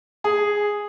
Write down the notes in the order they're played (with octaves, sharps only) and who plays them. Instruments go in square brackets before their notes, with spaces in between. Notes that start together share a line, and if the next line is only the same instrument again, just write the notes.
[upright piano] G#4